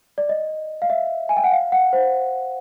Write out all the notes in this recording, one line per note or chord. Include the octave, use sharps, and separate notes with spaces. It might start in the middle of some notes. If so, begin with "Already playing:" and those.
D5
D#5
F5
E5
G#5
G5
F#5
F5
F#5
C5